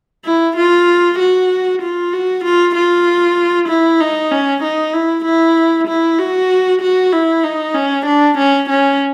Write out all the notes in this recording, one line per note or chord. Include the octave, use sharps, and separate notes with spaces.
E4
F4
F#4
F4
F#4
F4
F4
E4
D#4
C#4
D#4
E4
E4
E4
F#4
F#4
E4
D#4
C#4
D4
C#4
C#4